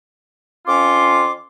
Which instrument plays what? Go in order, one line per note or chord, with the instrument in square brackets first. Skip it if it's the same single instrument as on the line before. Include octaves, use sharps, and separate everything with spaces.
[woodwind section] F2 C#4 F4 C6 D6